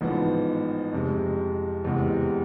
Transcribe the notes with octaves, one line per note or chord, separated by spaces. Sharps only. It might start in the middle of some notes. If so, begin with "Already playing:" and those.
A1 G#2 F3 B3
F2 C3 G#3
E2 C3 G#3